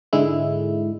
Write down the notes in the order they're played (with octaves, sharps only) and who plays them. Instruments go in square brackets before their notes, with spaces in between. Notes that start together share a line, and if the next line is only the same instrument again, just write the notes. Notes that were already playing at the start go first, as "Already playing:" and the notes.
[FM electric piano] G#2 D3 G#3 E4